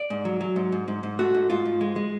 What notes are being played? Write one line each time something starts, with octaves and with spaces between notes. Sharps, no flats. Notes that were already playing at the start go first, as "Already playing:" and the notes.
Already playing: D5
G#2
F#3
F#3
G#2
G#2
G#2
G#2
A3 F#4
G#2
G#2 F4
G#2
G#3
G#3